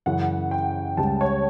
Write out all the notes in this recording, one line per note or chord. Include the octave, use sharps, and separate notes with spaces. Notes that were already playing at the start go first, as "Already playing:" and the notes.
F#2 C#3 E3 F#5
G5
C#2 C#3 G3 A5
C#5